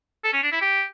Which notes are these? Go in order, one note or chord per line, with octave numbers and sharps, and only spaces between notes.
A4
C#4
D4
E4
G4